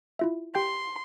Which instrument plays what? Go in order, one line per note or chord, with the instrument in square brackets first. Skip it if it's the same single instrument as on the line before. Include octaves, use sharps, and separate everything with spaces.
[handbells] E4 F4 E5
[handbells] G4 G5 G6 [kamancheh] C6